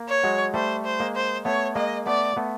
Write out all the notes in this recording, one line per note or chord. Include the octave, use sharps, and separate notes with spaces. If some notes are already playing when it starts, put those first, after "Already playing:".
Already playing: A#3
C#5
F#3 G#3
G3 A3 C5
C5
G#3 A#3
C5
A3 B3 C#5
G#3 A#3 D#5
A3 B3 D5
A3 B3